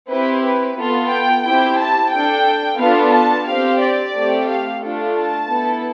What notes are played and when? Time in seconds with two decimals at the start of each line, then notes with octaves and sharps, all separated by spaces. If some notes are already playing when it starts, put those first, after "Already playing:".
0.10 C4 E4 G4 B4
0.44 B4
0.78 B3 F4 A4
1.11 G5
1.44 C4 E4 G4 G5
1.79 A5
2.13 D4 A4 G5
2.79 B3 D4 F4 A4 F5
3.14 A5
3.47 C4 G4 F5
3.81 D5
4.14 A3 C4 G4
4.48 F5
4.81 A3 D4 F4 A4
5.15 A5
5.49 B3 E4 A4